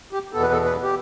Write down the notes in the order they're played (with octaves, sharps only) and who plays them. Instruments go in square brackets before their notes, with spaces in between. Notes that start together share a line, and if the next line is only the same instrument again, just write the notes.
[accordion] G4
E2 B2 B3 A4
B4
A4
B4
G4